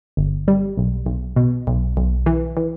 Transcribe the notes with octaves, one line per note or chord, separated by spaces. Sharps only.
G1
G3
B1
B1
B2
B1
B1
E3
E3